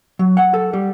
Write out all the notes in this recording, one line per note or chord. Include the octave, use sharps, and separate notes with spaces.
F#3
F#5
A4
G3